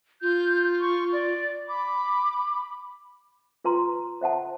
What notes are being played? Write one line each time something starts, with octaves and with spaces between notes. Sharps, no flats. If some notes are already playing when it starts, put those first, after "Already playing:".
F4 G6
C#6
D5
B5 D6
F4 B4 A#5 C6
C5 E5 F#5 A5